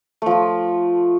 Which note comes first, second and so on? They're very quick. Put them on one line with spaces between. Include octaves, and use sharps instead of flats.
A3 F3 F4